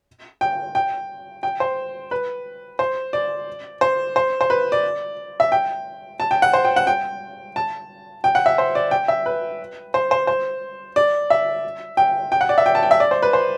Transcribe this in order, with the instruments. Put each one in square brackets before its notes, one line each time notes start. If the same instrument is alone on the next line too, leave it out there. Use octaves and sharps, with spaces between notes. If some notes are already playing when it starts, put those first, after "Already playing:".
[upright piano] G5
G5
G5
C5
B4
C5
D5
C5
C5
C5
B4
D5
E5
G5
A5
G5
F#5
C5
G5
F#5
G5
A5
G5
F#5
E5
C5
D5
G5
E5
B4
C5
C5
C5
D5
E5
G5
G5
F#5
D5
E5
G5
A5
G5
E5
D5
C5
B4
C5